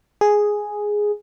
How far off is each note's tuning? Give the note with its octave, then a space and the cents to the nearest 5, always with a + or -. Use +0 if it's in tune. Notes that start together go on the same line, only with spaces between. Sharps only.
G#4 +0